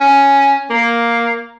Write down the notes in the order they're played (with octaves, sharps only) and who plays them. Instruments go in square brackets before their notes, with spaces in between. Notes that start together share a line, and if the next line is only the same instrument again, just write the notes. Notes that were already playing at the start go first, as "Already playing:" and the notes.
[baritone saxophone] C#4
A#3